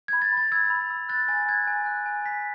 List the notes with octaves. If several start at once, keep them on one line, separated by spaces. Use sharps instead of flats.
G#6
B5
A6
B5
A6
E6 G#6
B5
E6
F#6 A6
G#5 A6
F#6 G#6
G#5
F#6
G#5
G#5 B6